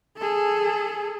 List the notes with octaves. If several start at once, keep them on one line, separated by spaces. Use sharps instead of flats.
G#4 A4